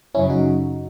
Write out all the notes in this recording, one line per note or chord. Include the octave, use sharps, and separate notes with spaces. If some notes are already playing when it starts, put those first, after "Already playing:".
F#2 C#3 F#3 C#4 E4
D#4 F#4